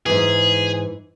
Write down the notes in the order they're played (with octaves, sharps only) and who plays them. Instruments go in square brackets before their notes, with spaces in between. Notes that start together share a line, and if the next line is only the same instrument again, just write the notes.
[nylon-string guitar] G#2 E3 [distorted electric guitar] G#4